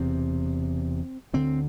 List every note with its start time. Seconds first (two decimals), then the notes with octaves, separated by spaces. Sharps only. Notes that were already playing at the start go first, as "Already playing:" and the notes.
Already playing: E1 E2 C3 C4
1.33 D2 D3 C4